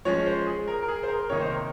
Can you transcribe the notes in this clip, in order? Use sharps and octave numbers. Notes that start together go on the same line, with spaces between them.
F3 G#3 C#4 C#5
C5
G#4
A#4
A#4
G#4
C5
A#4
C3 D#3 A#3 D#4 C#5
C5
A#4